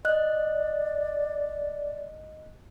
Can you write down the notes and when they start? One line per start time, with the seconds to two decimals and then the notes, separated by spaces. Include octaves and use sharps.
0.05 D5 D#5 F#6